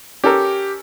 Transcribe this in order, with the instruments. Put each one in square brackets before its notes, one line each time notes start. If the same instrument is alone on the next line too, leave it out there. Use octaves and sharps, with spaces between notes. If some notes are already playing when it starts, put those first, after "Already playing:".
[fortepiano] C#4 A4 A#4 [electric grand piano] G4